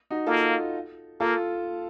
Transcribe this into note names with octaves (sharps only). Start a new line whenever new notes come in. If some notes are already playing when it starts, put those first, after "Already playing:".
D#4 F#4
A#3 F4 A4
A#3 F4 A4